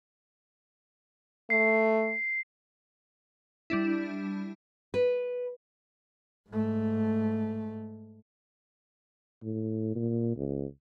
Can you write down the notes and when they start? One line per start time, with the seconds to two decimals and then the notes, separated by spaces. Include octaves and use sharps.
1.50 A3 C7
3.70 G3 D4 E4
4.94 B4
6.50 G#2 A3
9.43 A2
9.96 A#2
10.37 C#2